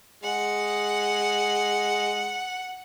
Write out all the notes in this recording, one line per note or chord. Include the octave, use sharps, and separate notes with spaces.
G#3 F#5